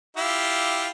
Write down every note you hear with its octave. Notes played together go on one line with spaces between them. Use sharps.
E4 F4 G4